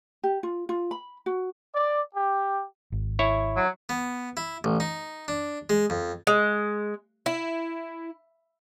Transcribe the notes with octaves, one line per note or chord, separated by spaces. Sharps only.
G4
F4
F4
B5
F#4
D5
G4
G#1
E4 C#5
F#3
B3
E4
A1
D#4
D4
G#3
F2
G#3
E4